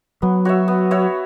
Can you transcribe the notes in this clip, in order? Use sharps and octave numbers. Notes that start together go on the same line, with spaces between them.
F#3 B3
F#4 C#5 E5
B3
F#4 C#5 E5